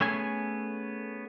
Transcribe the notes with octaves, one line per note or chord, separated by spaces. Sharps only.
A3 B3 C#4 G#4 G#5